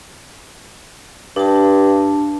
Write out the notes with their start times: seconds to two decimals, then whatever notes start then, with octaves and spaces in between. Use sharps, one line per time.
1.36 G2 D4 A5